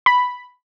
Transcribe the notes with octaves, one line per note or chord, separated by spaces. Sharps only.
B5